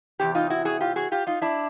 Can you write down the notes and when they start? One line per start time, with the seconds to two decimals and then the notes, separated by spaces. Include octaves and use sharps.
0.20 E2 C3 G4
0.35 D#4 F4
0.50 E4 F#4
0.65 F#4 G#4
0.81 F4 G4
0.96 F#4 G#4
1.12 F4 G4
1.27 D#4 F4
1.42 D4 E4